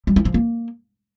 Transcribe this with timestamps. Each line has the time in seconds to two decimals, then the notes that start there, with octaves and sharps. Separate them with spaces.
0.07 G3
0.16 E4
0.25 F3
0.34 A#3